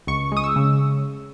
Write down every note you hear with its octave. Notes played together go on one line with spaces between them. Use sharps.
C#2 C#6
G#3 D#6
E6
C#3